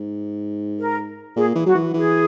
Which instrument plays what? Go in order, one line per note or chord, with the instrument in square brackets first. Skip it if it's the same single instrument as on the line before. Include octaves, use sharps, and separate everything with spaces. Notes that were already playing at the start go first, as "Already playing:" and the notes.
Already playing: [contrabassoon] G#2
[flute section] A#4
[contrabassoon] A#2 [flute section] G#4
[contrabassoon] E3
[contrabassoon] F#3 [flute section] F#4
[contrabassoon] E3
[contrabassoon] E3 [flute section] G#4